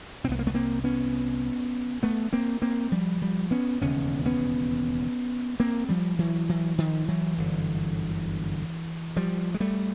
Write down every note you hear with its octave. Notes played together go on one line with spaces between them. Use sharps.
C2 C3 B3 C4
A#3
A3 B3
A#3 C4
B3 C#4
A3 B3
A#3 C4
A#3 C4
F3 G3
F3 G3
B3 C#4
E1 D#2 C#3 B3 C#4
B3 C#4
A#3 C4
F3 G3
E3 F#3
E3 F#3
D#3 F3
E3 F#3
G1 F#2 D3
F3 G3
G#3
G3 A3